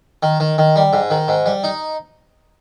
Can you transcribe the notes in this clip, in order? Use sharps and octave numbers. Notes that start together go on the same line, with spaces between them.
D#3
D#3
D#3
G3
G#2
D#3
G#2
G3
D#4